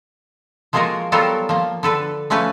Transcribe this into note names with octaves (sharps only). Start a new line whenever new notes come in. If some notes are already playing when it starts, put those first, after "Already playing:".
F3 G#3 A#3 F4 F#4 A#4
F#3 G3 B3 F4 A4 A#4
F3 A#3
D3 A4 B4
F3 A3 C#4 B4